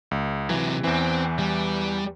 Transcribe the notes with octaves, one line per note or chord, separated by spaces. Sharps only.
C#2
C3 E3 F#3
E2 E3 C4
G3